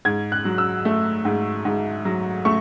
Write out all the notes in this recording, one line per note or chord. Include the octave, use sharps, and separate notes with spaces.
G#2 G#6
F#6
F#3
E6
A3
G#2
G#2
F#3
A3 C#6